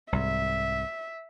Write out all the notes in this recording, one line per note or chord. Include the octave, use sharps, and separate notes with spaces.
C2 G#2 E5